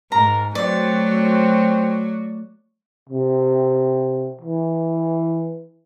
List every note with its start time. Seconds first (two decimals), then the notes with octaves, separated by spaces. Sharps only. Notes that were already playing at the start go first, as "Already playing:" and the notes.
0.12 G#2 A#4 A#5
0.55 F#3 A3 C4 F#4 D5
1.15 C4
3.10 C3
4.42 E3